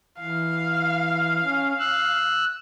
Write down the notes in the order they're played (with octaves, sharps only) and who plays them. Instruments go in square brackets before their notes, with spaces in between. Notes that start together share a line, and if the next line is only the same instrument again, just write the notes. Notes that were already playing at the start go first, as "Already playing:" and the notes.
[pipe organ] E3 [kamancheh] F5
[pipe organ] C#4
E6 F#6